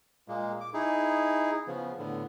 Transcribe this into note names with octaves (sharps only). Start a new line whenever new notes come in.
A#2 G#3 A#3
D6
D#4 E4 G#4
C#3 F3 B3
A2 D3 B3